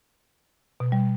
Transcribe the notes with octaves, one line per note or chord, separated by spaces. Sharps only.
B2
G3